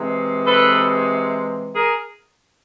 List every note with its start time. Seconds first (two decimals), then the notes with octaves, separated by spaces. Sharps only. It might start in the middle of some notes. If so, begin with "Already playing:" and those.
Already playing: C3 E3 G#3
0.45 A4 B4
1.73 G#4 A#4